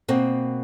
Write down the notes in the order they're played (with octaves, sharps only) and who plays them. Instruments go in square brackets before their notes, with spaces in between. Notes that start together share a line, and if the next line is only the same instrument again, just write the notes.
[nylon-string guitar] B2 A#3 C4